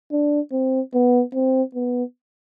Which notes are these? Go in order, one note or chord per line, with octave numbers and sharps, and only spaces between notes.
D4
C4
B3
C4
B3